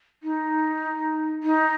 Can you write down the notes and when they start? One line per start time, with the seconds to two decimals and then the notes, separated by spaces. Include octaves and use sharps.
0.23 D#4
1.43 D#4